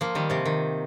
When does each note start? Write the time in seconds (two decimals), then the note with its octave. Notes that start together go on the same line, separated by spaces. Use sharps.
0.01 F3 A#3
0.15 D#3 G3
0.30 C3 F3
0.45 D#3